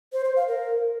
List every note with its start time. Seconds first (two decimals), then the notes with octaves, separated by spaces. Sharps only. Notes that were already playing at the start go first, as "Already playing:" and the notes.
0.13 C5
0.24 C5
0.36 F5
0.48 A#4